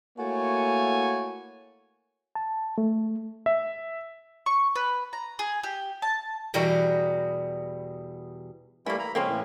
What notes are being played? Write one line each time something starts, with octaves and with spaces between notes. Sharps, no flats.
A3 A#3 E4 F#4 C#5 G#5
A5
A3
E5
C#6
B4
A#5
G#4
G4
A5
E2 B2 G3 F#4 A#4
E3 G3 A3 A#3 B5
A#5 B5
C#3 F3 G#3 A#3 C4 C#4
A2 E3